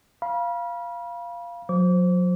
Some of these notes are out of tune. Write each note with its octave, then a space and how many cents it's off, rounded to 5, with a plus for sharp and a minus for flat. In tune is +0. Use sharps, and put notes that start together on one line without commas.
F5 -10 B5 -35
F#3 -35 C5 +0 D6 -35